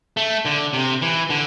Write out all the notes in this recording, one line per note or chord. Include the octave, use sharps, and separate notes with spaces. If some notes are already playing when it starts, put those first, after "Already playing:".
A3
D3
C3
E3
D3